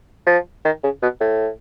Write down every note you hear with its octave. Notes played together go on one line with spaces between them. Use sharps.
F3
D#3
C#3
B2
A2